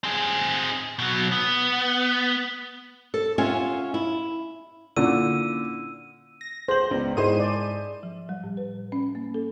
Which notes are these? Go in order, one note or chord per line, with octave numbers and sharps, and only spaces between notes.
C4 G#4
B2 F#3
B3
A4
C#4 F4 E5 F#5 G#5
E4
A#2 D3 C#4 E4 D5 E6 D#7
A#6
G#4 C5 F#7
C#2 B3 D5
G#2 D#4 E4 G#4 C5 D#7
D5
F3
G3
A2
B4
C#4
A#3
A4